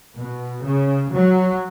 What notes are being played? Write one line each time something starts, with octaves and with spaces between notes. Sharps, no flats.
B2
C#3
F#3